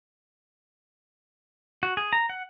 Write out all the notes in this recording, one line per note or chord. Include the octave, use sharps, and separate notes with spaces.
F#4
G#4
A#5
F#5